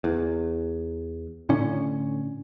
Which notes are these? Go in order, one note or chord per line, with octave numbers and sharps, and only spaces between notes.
E2
A2 D3 C#4